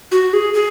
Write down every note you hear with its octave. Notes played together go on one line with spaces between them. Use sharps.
F#4
G#4
G#4